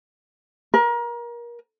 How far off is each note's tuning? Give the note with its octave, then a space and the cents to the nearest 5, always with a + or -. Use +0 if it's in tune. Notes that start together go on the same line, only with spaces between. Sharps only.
A#4 +30